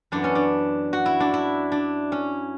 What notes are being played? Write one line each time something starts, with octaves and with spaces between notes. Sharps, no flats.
F#2 E3 B3 D4
C#4
D4
F#4
E4
D4
E4
D4
C#4